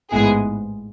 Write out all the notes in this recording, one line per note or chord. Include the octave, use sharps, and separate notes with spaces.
A1 G#2 G#3 B3 E4 G#4